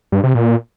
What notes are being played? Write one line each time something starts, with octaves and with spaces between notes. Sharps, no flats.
G2
C3
A#2